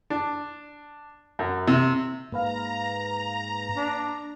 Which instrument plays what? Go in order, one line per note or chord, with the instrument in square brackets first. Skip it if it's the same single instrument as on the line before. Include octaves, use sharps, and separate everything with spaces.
[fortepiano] D4
F#2
C3
[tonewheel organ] G#2 [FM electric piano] A#3 B4 F5 [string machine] A#5
[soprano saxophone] D4